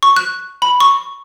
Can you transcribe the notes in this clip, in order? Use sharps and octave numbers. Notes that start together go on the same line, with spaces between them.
C#6
F#6
B5
C#6